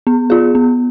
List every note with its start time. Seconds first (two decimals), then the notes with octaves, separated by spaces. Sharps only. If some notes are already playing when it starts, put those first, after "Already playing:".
0.07 B3
0.30 F4 G#4
0.55 B3